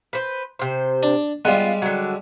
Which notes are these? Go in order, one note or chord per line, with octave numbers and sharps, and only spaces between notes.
B4 C5
C3 C5
D4
G3 G#3 B3 F4
D3 F#3